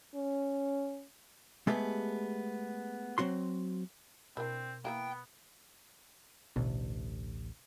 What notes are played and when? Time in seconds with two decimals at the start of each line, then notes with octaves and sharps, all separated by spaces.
0.15 C#4
1.67 G#3 A3 B3 G4 G#4
3.18 F#3 C4 F#4 C6
4.37 B2 C4 D4 E4 A#4
4.85 E3 A#3 B3 E4 G5
6.56 A1 D2 B2